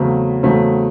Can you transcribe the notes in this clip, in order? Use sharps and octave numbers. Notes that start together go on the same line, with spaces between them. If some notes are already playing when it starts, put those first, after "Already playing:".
Already playing: E2 C#3 F#3 A3 C4
E2 C#3 F#3 A3 C4